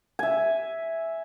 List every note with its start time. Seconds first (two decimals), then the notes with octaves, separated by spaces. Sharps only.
0.19 E5 G#5